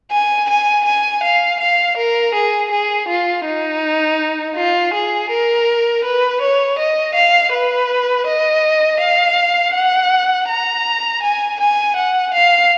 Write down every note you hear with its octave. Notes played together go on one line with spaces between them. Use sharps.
G#5
G#5
G#5
F5
F5
A#4
G#4
G#4
F4
D#4
F4
G#4
A#4
B4
C#5
D#5
F5
B4
D#5
F5
F#5
A#5
G#5
G#5
F#5
F5